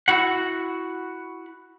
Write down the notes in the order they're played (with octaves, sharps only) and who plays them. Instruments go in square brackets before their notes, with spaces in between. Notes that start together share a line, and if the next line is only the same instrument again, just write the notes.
[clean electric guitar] E4 F#4 F#5